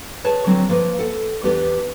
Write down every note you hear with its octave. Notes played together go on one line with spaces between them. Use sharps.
G#4 B4 C#5 A5
D3 F#3 C4
F3 A#3 B4
A4 F#5
E2 B3 D4 G4 B4